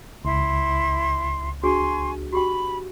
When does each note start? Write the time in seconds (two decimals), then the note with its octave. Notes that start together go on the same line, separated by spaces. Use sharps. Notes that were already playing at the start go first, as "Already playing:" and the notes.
0.25 C#2 E4 C6
1.63 D4 F#4 G#4 G#5 C6 C#6
2.32 F#4 G4 G5 B5